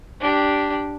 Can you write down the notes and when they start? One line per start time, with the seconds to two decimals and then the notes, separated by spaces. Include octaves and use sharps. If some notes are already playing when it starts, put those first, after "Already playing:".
0.20 D4 G4